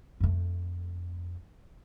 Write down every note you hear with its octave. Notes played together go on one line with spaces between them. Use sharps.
F2 A3